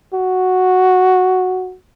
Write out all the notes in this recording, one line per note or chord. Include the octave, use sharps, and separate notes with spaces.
F#4